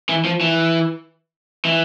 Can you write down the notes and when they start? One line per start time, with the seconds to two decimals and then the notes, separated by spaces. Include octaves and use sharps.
0.09 E3
0.25 F3
0.41 E3
1.65 E3